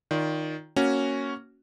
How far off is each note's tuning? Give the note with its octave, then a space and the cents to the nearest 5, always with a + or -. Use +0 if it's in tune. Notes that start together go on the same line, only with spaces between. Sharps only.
D#3 +0 F4 +0 D5 -25
A#3 +0 C#4 +0 F#4 +0